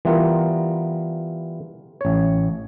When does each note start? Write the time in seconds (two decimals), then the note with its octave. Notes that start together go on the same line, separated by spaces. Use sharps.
0.05 E3 G3 B3 F4 A#4
2.01 A1 C#5